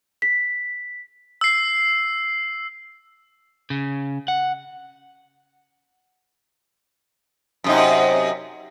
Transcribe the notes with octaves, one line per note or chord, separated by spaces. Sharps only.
B6
E6 C7
C#3
F#5
F#2 C3 D#4